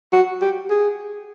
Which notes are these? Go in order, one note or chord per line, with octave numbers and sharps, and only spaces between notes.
F#4
G4
G#4